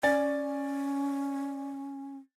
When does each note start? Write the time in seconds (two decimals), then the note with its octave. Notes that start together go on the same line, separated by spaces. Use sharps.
0.03 C#4 D5 G#5 A6